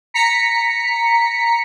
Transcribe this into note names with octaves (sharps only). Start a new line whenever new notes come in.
A#5 B6 C#7